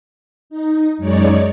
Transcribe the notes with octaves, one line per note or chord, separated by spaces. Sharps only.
D#4
F#2 G#3 D#4 C#5 D5